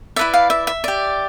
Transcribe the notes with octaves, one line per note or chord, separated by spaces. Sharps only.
E4 B4 D5 E5
F5
E5
E5
G4 D5